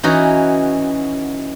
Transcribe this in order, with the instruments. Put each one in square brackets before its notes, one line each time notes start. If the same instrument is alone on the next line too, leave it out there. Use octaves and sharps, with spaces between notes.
[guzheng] E3 C#4 D#4 F#4 D#5